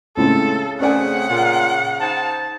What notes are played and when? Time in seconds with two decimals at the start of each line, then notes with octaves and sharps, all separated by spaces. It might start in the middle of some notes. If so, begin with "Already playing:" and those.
0.17 C#2 A2 C#3 C4 A4
0.80 A3 C4 C#4 G#4 D5 F#5 G#5
1.29 A#2 F4
2.01 D#4 C5 A5